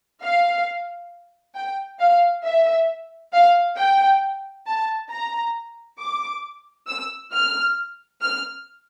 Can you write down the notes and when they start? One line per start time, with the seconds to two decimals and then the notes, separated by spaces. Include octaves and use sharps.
0.22 F5
1.55 G5
1.99 F5
2.44 E5
3.33 F5
3.76 G5
4.66 A5
5.10 A#5
5.99 D6
6.87 E6
7.32 F6
8.21 F6